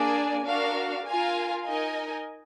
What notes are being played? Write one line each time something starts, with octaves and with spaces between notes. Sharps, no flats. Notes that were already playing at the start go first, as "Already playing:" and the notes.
Already playing: A#3 D4 G#4 D5 G#5
D4 F#4 A#4 F5
F4 A#4 F5 G#5
D#4 A#4 D#5 G#5